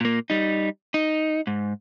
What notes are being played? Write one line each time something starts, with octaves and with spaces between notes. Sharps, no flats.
A#2 A#3
G3 D#4
D#4
G#2